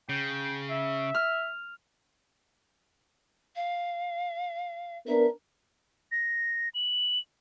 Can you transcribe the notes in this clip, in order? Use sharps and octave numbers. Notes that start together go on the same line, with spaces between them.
C#3 G5
E5
F6
F5
B3 D4 A#4 E5
A#6
F#7